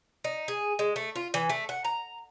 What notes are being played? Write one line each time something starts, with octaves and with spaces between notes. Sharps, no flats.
D#4
G#4
G#3
A3
F4
E3
A3
F#5
A#5